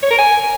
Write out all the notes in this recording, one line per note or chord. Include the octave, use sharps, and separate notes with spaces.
C#5
A#4
G#5